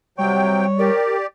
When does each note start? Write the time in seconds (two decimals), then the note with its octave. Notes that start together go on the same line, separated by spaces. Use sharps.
0.18 C3 F#3 G3 C#5 G5
0.79 G4 A#4 D5